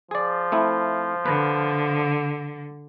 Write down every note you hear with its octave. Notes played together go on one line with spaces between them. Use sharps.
F3 G#4 D5
A3 C4 E4
D3 B4